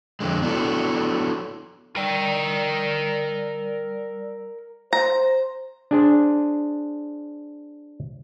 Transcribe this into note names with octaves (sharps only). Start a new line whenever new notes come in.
F2 D3 G#3
B3 D4 E4 F#4 A4
G3 A#4 D5 G5 E6
C5 A#5
D4 G#4 C5